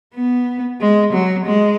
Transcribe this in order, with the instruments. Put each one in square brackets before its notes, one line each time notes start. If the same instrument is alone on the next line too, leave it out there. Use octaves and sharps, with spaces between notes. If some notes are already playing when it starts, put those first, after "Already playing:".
[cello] B3
G#3
F#3
G#3